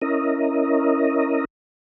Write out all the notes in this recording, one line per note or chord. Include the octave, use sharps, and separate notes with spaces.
C#4 E4 A#4 D#5